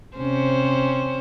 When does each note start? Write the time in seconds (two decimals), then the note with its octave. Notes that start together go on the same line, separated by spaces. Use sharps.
0.17 C3 C#4 C5